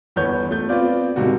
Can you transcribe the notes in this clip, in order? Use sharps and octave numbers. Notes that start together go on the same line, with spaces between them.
G1 E2 B3 C#5 G6
A3 G6
B3 C4 F4 D5
D#1 G#2 C3 G3 F#4 G4